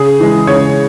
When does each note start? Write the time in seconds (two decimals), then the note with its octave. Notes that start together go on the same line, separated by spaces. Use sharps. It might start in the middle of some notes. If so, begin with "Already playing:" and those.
Already playing: C#3 G#4
0.20 E3 G#3
0.47 C#3 C#5